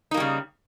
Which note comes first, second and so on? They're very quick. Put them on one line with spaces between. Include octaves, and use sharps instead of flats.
D#4 A#3 G3 C#3